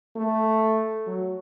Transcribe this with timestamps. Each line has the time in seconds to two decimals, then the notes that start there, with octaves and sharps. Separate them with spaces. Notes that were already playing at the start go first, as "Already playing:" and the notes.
0.16 A3
1.07 F#3